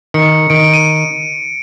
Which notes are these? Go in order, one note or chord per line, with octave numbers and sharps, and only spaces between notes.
D#3 C#7
D#3 D7
D#7